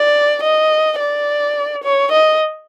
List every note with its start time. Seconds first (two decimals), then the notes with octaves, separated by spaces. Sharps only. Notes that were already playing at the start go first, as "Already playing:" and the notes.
Already playing: D5
0.43 D#5
1.00 D5
1.84 C#5
2.12 D#5